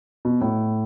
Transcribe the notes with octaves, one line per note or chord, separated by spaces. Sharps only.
B2
A2